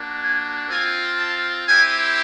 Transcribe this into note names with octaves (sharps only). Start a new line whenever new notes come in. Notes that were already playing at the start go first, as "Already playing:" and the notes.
Already playing: A#3 D4 F#4
G#5
C4 F4 G#5
A5
C4 E4 G4 G#5